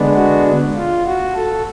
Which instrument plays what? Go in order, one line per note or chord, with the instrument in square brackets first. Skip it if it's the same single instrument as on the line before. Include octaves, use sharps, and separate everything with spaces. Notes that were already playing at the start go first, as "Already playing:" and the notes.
Already playing: [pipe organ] D3 G#3 B3 D4
F#4
F4
F#4
A4